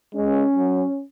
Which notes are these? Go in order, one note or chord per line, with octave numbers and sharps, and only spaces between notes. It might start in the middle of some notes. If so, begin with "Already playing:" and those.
G#3 C#4
F#3